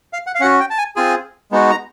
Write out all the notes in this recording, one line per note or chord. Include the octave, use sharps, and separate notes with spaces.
F5
F#5
F5
C#4 F#4 F#5
G5
A5
G#5
C4 F4 G#4 G#5
G#3 B3 D#4 F#4
A#5